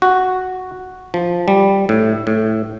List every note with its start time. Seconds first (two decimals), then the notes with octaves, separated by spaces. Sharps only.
0.02 F#4
1.14 F3
1.48 G3
1.89 A2
2.27 A2